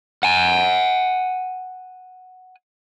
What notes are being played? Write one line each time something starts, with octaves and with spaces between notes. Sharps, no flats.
F#5 G#5